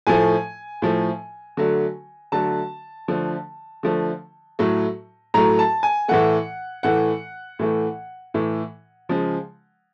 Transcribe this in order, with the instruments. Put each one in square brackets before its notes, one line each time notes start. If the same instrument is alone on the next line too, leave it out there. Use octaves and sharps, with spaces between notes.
[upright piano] A2 F3 A3 G#5
A2 F3 A3
D3 F#3 A3
D3 F#3 A3 A5
D3 F3 A3
D3 F3 A3
A2 F#3 A3
A2 F#3 A3 A#5
A5
G#5
A2 E3 A3 F#5
A2 E3 A3 F#5
A2 E3 A3
A2 E3 A3
C#3 F3 G#3